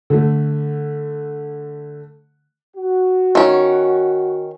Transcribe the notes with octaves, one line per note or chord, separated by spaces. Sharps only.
D3 A3
F#4
D#3 C#4